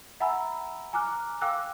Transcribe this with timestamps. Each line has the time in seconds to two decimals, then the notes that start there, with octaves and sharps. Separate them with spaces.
0.20 E5 F#5 G#5 A#5 B5 E6
0.93 G#5 A#5 D6 F6 F#6
1.41 F5 G5 D6 E6 F#6